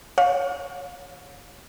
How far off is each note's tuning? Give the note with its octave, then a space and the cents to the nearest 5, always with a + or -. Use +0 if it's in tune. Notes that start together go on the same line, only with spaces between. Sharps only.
C#5 +0 F5 +35